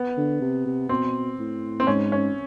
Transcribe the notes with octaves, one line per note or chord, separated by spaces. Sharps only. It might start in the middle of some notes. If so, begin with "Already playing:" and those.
Already playing: B3
D3
C3
C3
B2 C4
A2
C4
G#2 C#4
C#4